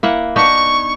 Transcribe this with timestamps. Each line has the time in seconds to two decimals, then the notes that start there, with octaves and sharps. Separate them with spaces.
0.03 A#3 E4 F#5
0.36 B3 D4 D#4 C#6